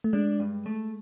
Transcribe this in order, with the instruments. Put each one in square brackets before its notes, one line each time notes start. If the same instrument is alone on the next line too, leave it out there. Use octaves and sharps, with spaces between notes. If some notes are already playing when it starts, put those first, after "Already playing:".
[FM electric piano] A3
[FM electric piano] G#3 [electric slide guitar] D4
[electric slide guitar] G2
A3